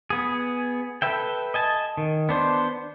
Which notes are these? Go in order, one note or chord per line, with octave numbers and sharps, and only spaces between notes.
B3 G#4
A4 B4 E5 G5
D#5 G#5 A5
D#3
B3 D4 C5